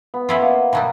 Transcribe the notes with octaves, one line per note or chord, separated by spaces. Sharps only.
B3
C#4 E4 F4
A#3
B2 F#3 G3